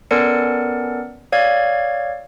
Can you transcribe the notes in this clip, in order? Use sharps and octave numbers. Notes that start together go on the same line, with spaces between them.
B3 C#4 A4 A#4 D5 C#7
C#5 D5 F5 E6 G#6